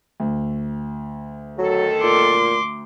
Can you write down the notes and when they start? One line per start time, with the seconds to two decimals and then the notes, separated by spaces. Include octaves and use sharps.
0.20 D2
1.58 D#3 F#3 A4
2.03 A#2 C6 D6